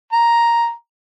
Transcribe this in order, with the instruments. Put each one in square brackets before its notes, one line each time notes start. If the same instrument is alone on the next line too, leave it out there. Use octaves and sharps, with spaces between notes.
[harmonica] A#5